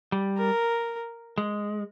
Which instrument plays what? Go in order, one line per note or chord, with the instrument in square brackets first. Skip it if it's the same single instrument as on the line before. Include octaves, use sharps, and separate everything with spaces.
[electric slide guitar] G3
[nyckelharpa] A#4
[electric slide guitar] G#3